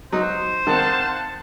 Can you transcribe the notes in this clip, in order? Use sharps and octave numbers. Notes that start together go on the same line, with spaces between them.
F#3 D#4 C5
D#3 C4 F5 F#5 A5